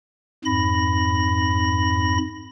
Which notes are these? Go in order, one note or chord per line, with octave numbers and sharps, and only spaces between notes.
F2 G#2 B5 A#6